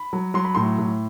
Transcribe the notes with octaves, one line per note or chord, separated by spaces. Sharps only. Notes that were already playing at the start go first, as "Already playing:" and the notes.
Already playing: B5
F#3
F#3 C6
B5
A2 C6
A2